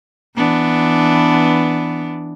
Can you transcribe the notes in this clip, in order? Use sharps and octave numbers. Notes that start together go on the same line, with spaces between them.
E3 B3 D4